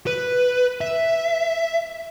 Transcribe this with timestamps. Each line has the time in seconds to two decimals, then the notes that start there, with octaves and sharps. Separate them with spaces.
0.07 B4
0.81 E5